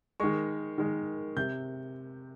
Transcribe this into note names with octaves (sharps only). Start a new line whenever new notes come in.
D#3 G#3 C#6
D#3 G#3
C3 G6